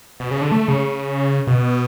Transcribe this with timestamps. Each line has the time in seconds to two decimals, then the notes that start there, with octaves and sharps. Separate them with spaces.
0.20 B2
0.31 C#3
0.42 D3
0.52 A3
0.68 C#3
1.47 B2